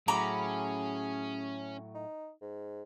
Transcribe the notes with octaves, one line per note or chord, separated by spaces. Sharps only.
A2 F#3 C#4 G#4 A#5 B5 D6
D#4
G#2